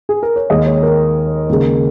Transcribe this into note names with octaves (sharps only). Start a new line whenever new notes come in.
G#4
A#4
C#5
D#2 D#3 G#3 D#5
C#5
A#4
D#2 C#3 G#3